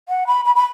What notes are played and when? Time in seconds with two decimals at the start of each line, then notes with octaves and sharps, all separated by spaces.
0.09 F#5
0.27 B5
0.45 B5
0.56 B5